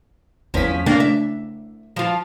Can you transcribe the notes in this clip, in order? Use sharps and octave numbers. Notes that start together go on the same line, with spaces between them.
G1 E2 F3 C#4 B6
C#3 A#3 D4
E5
F3 F4